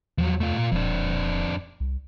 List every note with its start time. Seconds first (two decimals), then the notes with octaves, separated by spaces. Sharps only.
0.18 E2 F3 F#3
0.41 A3 F4
0.57 A#2 F4
0.72 D#1 F2 D4
1.80 C2